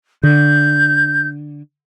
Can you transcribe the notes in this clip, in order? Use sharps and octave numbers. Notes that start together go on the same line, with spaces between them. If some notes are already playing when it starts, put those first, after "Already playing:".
D3 G6